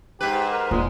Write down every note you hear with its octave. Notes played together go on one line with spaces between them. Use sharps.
G#2 G4 B4
A#4
E1 A#2 G#3 D4